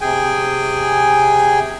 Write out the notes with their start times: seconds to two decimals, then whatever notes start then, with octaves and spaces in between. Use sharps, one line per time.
0.01 C3 G#4 G5 G#5